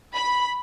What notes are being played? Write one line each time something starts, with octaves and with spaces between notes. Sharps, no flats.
B5